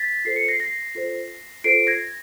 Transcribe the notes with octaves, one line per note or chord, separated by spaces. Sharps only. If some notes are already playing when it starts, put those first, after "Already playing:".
Already playing: A6 B6
F4 A4 C5 C7
C#7
A#6 C7
A#6 C7
F4 A4 C5
F4 A4 C5 C7 D7
G#6 A#6